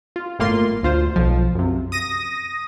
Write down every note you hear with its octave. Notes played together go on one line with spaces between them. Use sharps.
F4
G1 A2 A#3 F4 C6
D2 F4 C5
B1 F3
F#2 C3
D#6 A#6 D#7